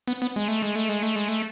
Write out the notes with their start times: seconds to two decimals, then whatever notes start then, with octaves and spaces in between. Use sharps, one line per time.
0.08 B3
0.22 B3
0.36 G#3
0.48 A3
0.62 G#3
0.76 A3
0.89 G#3
1.03 A3
1.16 G#3
1.29 A3